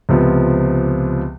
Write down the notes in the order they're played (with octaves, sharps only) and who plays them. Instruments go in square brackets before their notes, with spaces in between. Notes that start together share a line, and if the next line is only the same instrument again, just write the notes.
[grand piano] C#2 C3 F3 B3